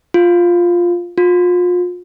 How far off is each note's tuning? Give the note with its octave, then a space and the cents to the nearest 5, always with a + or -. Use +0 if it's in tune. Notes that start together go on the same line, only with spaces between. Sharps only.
F4 +5
F4 +35